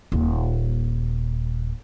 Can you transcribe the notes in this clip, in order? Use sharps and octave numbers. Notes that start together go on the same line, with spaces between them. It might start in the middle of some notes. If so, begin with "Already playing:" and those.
D#1 A#2